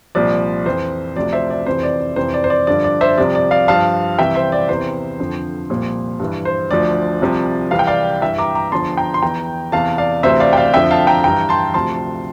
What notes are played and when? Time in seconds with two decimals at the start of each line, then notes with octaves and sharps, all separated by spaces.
0.15 C2 A#2 F3 D5
0.66 F2 E3 C5
1.16 D2 C3 F3 D5
1.33 C5 E5
1.50 D5
1.66 F2 C3 E3 C5
1.83 D5
2.00 D5
2.16 F2 C3 E3 C5
2.34 D5
2.44 C5
2.50 D5
2.67 G2 D3 F3 D5
2.84 D5
3.01 C5 E5
3.18 C2 C3 F3 D5
3.35 D5
3.51 D5 F5
3.68 G2 F3 F5 A5
4.19 C2 C3 E3 E5 G5
4.35 C5 E5
4.52 D5
4.69 E2 C3 E3 C5
5.19 F2 D3 F3
5.70 C2 A#2 F3
6.20 G2 E3
6.45 C5
6.71 D2 D3 F3 D5
7.21 C2 C3 F3
7.71 C2 C3 E3 F5
7.79 G5
7.87 D5 F5
8.22 G2 E3 E5 G5
8.38 A#5 D6
8.55 A#5 D6
8.72 E2 D3 F3 A5 C6
8.97 G5 A#5
9.14 C6
9.22 E2 E3 G5 A#5
9.72 E2 C3 E3 F5 A5
9.98 D5 F5
10.23 D2 C3 E3 C5 E5
10.40 D5 F5
10.53 G5
10.57 D5 F5
10.74 F2 D3 F3 E5 G5
10.91 F5 A5
11.07 G5 A#5
11.24 G2 E3 G5 A#5
11.49 A5 C6
11.74 D2 C3 F3 A5 C6